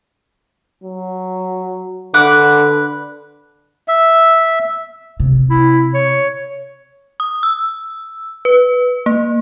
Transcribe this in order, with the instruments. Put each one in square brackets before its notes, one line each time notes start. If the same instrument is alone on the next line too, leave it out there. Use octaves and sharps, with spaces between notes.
[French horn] F#3
[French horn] D3 [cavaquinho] B4 F#5 D6
[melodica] E5
[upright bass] C3
[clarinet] E4
C#5
[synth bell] D#6
E6
B4
A#3